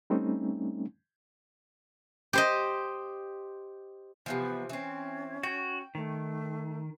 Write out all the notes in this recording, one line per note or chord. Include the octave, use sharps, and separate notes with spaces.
G3 A3 C4 C#4 D#4
G4 C5 D#5
C3 E3 F3 B3
E3 C4 C#4
F#4 G5
D#3 A3